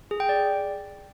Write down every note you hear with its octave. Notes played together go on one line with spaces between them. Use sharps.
G#4
G5
D5